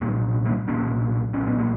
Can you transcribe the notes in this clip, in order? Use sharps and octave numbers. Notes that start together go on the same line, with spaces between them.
B1 A#2 G3 A#3
G3 A#3
B1 A#2 A#3 C#4
B1 C#4
A#2
B3
A#3